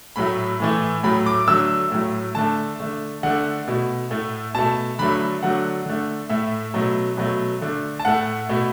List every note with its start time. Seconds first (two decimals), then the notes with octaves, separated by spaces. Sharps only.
0.16 A2 F#3 A3 B5
0.60 A2 E3 A3
1.03 A2 F#3 A3 B5
1.26 D6
1.47 D3 F#3 A3 E6
1.91 A2 F#3 A3
2.35 D3 A3 A5
2.80 D3 A3
3.23 D3 A3 F#5
3.68 B2 A3
4.10 A2 A3
4.55 B2 A3 A5
4.99 D3 F#3 A3 B5
5.43 D3 F#3 A3 F#5
5.86 D3 A3
6.29 A2 A3 E5
6.74 B2 F#3 A3
7.17 B2 F#3 A3
7.62 D3 A3
7.99 A5
8.05 A2 A3 F#5
8.49 B2 A3